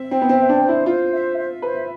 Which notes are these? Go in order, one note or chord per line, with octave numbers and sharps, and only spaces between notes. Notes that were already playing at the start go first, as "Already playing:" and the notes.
Already playing: C4 E5
C4 G5
B3
C4
C5
D4
C5
E4
F4 C5
E5
E5
B4 C5